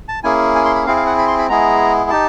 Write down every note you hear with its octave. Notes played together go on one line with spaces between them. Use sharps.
A5
A#3 C#4 E4 G#4 G#5
G#5
C6
B5
C4 E4 G#4 F5
F5
F#5
B5
C6
B5
G#3 B3 E4 G#4 A#5
D#4 G4 A5